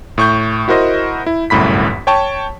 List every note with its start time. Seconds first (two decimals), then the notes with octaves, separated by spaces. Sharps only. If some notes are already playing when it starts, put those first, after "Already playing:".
0.18 A2 C#6 G6
0.68 E4 F#4 A#4 C5 D#5
1.27 E4
1.50 G1 C2 F#2 A2 B5 B6
2.07 C#5 G5 A5 C#6